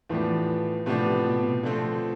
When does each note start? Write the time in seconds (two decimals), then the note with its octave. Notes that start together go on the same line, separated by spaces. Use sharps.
0.09 A2 E3 F3 B3 D4 G4
0.86 A2 C3 F3 B3 D4 G4
1.25 B2
1.63 D3 F3 A3 C4